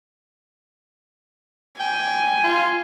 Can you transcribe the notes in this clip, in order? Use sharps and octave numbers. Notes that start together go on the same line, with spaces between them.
G5 G#5
F4